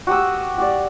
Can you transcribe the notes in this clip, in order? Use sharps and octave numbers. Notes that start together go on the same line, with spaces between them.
F#4 G4 D#6 E6
F#4 G4 D5